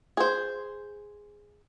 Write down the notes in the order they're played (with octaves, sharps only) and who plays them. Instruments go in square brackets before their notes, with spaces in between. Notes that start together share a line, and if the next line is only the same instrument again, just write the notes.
[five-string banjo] G#4 C5